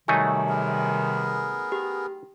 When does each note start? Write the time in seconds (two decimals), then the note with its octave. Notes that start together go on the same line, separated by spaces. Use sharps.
0.08 C3 D#3 F#3 G3 A3 D#4 G#5
0.49 B3 G#4 A#4
1.72 G4